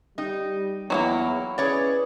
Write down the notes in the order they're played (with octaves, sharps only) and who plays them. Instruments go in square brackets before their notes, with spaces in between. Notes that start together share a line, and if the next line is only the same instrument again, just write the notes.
[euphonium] G3 [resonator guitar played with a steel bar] D#4 [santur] G5
[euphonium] E2 [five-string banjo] F#3 G#3 A#3 [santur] E4 C#5 G5
[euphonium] C#4 [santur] G#4 B4 E5 [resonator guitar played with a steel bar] C#5 D5